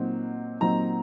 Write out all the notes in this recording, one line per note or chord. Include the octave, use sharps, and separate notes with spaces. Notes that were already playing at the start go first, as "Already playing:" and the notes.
Already playing: A#2 F#3 C4 D#4
A#2 F#3 C4 D#4 A#5